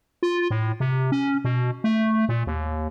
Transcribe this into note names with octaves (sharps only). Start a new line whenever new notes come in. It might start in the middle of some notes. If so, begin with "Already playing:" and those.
F4
A2
C3
C#4
B2
A3
A#2
D#2